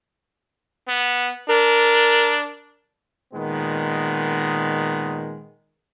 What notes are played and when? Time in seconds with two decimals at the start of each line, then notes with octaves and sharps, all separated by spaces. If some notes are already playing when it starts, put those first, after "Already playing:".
0.88 B3
1.49 D4 A#4
3.33 A#2 D#3 G#3 B3